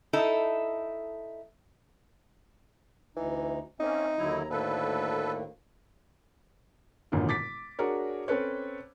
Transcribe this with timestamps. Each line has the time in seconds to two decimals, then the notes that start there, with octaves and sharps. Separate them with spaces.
0.13 D#4 E4 A4 D#5
3.17 D2 E3 D#4
3.80 A#3 C4 C#4 D#4 E5
4.18 D#2 D3 F#3 E4 A#5
4.50 D2 A2 D#3 A#3 A4 B4
7.12 E1 A1 A#2 D3 D#3
7.29 D6 A6 B6
7.79 D4 F#4 G#4 A#4 C#5
8.28 C4 C#4 A4 B4 C#5